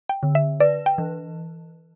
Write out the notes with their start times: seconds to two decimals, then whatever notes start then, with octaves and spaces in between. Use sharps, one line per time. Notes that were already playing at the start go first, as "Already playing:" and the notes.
0.09 G5
0.23 D3
0.35 E5
0.60 B4 D5
0.86 G5
0.98 E3